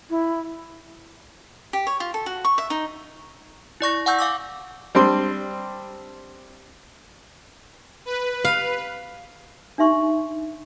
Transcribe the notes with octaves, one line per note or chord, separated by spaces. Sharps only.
E4
G4
C#5
F4
A4
F#4
C#6
E5
D#4
E4 D5 C#6 A#6
F#5 G#5 C#6 E6 G6
F5 D6 E6
G3 C4 D4 C6
B4
F5
D4 D#4 E5 C6 C#6